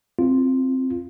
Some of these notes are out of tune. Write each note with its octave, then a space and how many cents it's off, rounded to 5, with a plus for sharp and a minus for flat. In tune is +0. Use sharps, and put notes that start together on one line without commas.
C4 +0 F4 -5